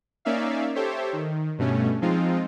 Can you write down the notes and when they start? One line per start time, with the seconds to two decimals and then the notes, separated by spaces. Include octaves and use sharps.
0.25 A#3 C#4 D#4 D5 E5 F5
0.75 G4 A4 C5 C#5 E5
1.13 D#3
1.58 G2 B2 A3 C#4
2.01 F3 G#3 C4 D#4 F4